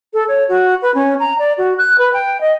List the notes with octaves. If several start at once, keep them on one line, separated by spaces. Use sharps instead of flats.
A4
C#5
F#4
B4
C#4
A#5
D5
F#4
F#6
B4
G5
D#5